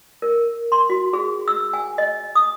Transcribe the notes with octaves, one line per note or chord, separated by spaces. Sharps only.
A#4
C6
F#4
G#4
E6
G#5
D#5
D#6